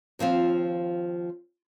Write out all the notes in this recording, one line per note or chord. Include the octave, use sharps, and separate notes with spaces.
D#2 F3 C4 F4